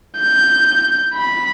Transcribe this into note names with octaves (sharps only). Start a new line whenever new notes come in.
G6
B5